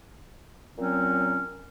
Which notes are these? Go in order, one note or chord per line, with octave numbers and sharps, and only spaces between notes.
A#2 F#3 C4 C#4